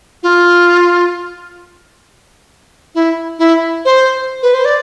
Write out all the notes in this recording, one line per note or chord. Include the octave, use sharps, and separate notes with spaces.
F4
E4
E4
C5
B4
C5
D5